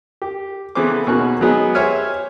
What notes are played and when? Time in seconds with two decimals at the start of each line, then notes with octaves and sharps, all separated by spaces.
0.22 G4
0.75 C#3 E3 B3 A4 C5 D6
1.06 D#2 B2 C#4 F#4 A#4 F#6
1.41 F#3 G#3 B3 D#4 G#4
1.75 G4 C5 C#5 E5 G#5 F6